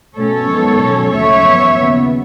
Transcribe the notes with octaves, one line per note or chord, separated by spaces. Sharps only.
B2 A3 C#4 A4 C#5
F#2 D#3 G#3 B3
B2 F#3 C#4
D#2 C#3 F#3 A3 C#5 E5
F#2 E3 B3
D#2 C#3 F#3 B3